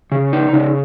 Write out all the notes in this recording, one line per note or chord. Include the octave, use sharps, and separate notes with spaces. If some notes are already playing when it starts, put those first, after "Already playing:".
C#3
D#4
C#3